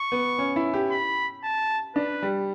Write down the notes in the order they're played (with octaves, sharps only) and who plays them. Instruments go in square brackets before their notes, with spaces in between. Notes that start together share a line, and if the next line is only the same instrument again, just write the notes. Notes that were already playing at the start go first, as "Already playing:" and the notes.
Already playing: [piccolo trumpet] C#6
[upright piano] B3
C#4
E4
G4
[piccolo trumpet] B5
A5
[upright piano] D4 [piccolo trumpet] B4
[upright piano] G3